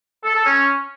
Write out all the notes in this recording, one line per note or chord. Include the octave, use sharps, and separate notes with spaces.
A4
A4
C#4